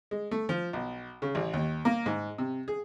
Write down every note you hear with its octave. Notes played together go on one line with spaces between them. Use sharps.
G#3
A3
F3
B1
C#3
A1
D#2
A#3
G#2
C3
G#4